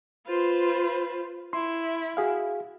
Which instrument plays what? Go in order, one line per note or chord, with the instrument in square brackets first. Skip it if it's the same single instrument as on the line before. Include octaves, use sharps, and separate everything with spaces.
[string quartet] F4 B4 C5
[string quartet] E4 [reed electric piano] C6
[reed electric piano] F#4 G#4 F5